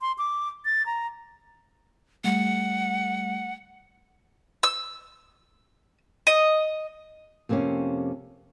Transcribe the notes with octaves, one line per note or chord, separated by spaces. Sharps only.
C6
D6
A6
A#5
G3 A3 F#5
E6
D#5
F2 C3 A#3 B3 C#4